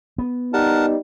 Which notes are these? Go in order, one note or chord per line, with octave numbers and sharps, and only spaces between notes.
B3
G3 D#4 A#4 F#5 A5